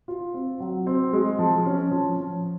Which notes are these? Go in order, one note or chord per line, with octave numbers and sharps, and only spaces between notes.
F4
C4
F#3
C4
G#3
F3
C#4
F3
F3